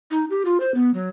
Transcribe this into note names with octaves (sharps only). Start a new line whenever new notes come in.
D#4
G4
F4
C5
B3
F#3